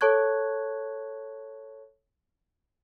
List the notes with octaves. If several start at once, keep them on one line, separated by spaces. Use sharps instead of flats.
A4 C#5 A5 C#6 F#6 G#6